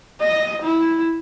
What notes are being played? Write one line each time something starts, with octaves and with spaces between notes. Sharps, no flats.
D#5
E4